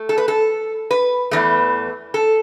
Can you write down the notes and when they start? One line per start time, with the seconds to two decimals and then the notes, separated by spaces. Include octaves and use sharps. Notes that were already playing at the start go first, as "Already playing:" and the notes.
Already playing: A3
0.09 A4
0.18 B4
0.28 A4
0.91 B4
1.31 E2 E3 A3
2.14 A4